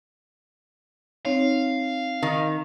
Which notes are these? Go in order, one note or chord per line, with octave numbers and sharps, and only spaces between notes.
C4 D#4 C#5 F5
D#3